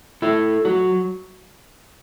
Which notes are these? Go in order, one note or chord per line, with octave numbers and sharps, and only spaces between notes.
A3 E4 A4
F#3 F#4